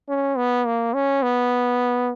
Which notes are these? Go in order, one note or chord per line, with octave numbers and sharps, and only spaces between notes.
C#4
B3
A#3
C#4
B3